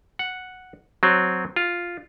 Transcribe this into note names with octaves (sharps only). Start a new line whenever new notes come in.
F#5
F#3 C4
F4